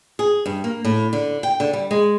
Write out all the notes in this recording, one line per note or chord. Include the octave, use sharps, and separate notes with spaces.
G#4
G2
A#3
A2
D3
G5
D3
G3
G#3